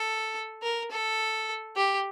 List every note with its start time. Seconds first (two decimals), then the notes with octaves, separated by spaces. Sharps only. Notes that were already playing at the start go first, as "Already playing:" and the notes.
Already playing: A4
0.63 A#4
0.91 A4
1.76 G4